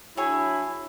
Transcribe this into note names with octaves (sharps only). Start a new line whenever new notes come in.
F#3 D4 E4 G#4 C#5